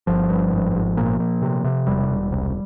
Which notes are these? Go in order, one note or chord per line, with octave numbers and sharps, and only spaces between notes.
G1 F3
G2
G#1
G#1
A#2
A#2
C3
C3
E1 G3
E1
C2